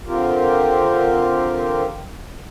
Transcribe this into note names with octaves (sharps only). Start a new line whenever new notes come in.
D3 C4 F4 G4 A#4